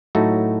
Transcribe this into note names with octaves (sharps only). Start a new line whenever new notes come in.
A2 F#3 A3 D#4 F#4